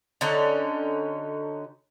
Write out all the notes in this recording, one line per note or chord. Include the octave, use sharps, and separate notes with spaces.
D3 F#3 C#4 D#4